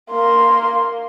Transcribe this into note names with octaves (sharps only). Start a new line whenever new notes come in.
A#3 C6